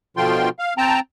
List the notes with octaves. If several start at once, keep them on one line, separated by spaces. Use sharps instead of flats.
B2 D3 F3 F4 G5 C6
F5
C4 G5 A5 A#5